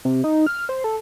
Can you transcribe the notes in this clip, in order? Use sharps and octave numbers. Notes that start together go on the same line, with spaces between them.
C3
D#4
F6
C5
A4